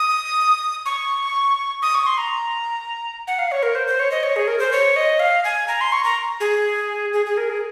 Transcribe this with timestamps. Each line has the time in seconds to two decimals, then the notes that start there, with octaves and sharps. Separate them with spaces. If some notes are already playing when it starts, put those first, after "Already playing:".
Already playing: D#6
0.86 C#6
1.82 D#6
1.95 C#6
2.07 C6
2.18 A#5
3.27 F#5
3.39 F5
3.52 C#5
3.63 A#4
3.75 C5
3.87 C5
4.00 C#5
4.11 D#5
4.23 C#5
4.36 G#4
4.48 A#4
4.59 C5
4.72 C#5
4.96 D#5
5.20 F5
5.44 G#5
5.68 A#5
5.81 C6
5.92 C#6
6.04 A#5
6.40 G#4
7.13 G#4
7.26 G#4
7.37 A#4
7.50 G#4